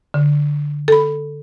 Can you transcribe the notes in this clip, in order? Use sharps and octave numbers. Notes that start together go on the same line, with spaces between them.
D3
A4 B5